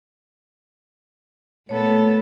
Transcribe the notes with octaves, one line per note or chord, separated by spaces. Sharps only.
A#2 A3 B3 A4 C#5